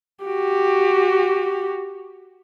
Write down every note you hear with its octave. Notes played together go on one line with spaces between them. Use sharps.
F#4 G4